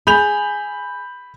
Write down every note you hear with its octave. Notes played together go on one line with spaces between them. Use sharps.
G#4 B5 G6 F7